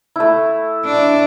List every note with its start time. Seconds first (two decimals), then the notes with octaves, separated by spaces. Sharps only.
0.16 A3 E4
0.85 D4